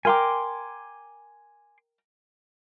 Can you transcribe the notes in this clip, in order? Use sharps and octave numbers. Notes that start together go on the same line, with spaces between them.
A#4 G5 G#5 A#5 C6 D6